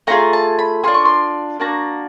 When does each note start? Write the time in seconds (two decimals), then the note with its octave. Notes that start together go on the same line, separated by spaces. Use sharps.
0.07 A3 D4 F4 G#4 A#5
0.33 A5
0.59 B5
0.84 D4 F4 G#4 C6
0.94 C#6
1.05 C6
1.59 A#3 D4 F#4 A#5